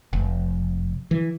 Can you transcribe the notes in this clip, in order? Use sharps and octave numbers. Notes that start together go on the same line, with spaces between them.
F1
E3